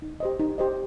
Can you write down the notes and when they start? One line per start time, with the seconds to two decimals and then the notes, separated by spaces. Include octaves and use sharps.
0.02 D#4
0.20 G4 C5 D#5
0.39 D#4
0.58 G4 C5 D#5